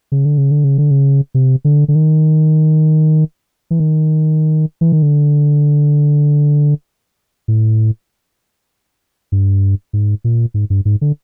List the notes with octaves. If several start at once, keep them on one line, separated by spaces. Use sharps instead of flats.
C#3
D3
C#3
D3
C#3
D3
C#3
C3
D3
D3
D#3
E3
D#3
E3
D#3
D3
A2
G2
G#2
A#2
G#2
G2
G#2
D3